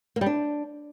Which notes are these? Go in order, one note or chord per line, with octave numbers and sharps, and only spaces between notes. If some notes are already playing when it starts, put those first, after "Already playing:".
A#3
G3
D4